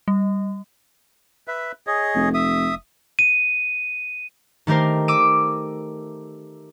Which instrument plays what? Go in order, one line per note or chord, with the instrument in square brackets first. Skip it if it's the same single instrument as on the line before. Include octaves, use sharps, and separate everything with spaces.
[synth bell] G3
[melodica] B4 E5
G#4 C#5 D#5
[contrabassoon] F1
[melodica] E5 D#6
[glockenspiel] D#7
[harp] D#3 A3 G4 A#4 C5
D6 E6 D7 D#7